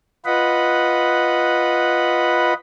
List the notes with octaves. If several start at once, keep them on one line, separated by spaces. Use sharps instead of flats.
F4 B4 D#5 F#5 B5